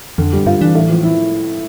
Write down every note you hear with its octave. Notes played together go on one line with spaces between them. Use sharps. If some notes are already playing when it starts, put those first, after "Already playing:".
F2 D3
G3
G2 F4
E3 D4
A2
F3
E4